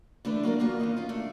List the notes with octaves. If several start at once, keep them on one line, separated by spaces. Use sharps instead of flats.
D3 E3 A3 D4 B4
F#3 A#3 A#4 D5
E2 A#3 F4 F#4 A#5
E2 C3 D#3 D#5
C#4 F4
A3 D4